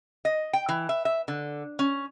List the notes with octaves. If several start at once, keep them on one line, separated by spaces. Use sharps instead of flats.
D#5
G5
E3
E5
E5
D3
C#4